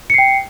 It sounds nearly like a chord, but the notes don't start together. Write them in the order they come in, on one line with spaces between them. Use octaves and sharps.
C#7 C7 G5